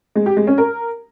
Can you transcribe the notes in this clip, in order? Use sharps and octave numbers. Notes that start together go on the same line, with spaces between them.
G#3
G4
G#3
C#4
A#4